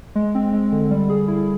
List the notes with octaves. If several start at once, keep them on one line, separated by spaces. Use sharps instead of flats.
G#3
C4
G#3
D3
G3
G#4
E4